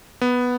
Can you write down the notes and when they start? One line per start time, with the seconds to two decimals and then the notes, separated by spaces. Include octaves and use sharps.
0.21 B3